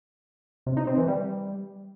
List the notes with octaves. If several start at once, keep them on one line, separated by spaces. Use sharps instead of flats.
C3
D#4
C4
E3
G3